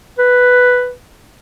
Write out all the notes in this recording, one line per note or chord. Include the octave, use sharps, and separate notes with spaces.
B4